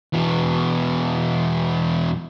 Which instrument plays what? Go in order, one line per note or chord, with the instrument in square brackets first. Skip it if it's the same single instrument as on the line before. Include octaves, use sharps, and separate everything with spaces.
[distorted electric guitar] E2 B2